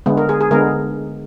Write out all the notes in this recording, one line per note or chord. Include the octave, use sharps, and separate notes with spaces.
D3 G#3 B3
A#4
G#4
G#4
D3 G#3 B3 A#4